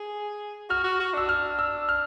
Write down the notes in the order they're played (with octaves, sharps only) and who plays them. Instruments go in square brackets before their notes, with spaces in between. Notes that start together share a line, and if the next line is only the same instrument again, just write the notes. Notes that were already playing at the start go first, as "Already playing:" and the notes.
Already playing: [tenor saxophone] G#4
[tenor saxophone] F#4 [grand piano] F6
[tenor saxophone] F#4
F#4
[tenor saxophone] D4 [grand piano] E6
[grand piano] F6
E6
F6